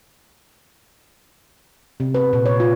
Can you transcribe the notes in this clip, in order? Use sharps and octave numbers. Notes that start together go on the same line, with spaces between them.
C3
B4
A#2
C#5
F4